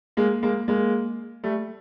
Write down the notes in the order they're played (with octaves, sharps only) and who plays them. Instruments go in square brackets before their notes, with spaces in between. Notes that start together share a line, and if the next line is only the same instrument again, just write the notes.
[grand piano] G#3 A#3
G#3 A#3
G#3 A#3
G3 A3